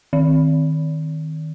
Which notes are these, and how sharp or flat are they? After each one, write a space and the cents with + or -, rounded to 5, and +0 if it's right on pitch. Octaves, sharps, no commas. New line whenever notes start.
D#3 +5